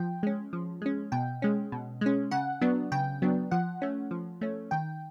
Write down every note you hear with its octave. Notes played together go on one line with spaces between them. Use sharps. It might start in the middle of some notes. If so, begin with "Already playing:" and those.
Already playing: F3 G5
G#3 C#4
F3
G#3 C#4
B2 G5
G#3 C#4
B2
G#3 C#4
C#3 F#5
F#3 B3 D4
C#3 G5
F#3 B3 D4
F3 F#5
A3 C#4
F3
A3 C#4
D#3 G5